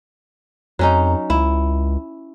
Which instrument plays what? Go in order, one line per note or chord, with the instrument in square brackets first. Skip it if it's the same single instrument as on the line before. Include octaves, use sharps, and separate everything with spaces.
[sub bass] F2 [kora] F#3 C#4 D#4
[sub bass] C#2 [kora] E4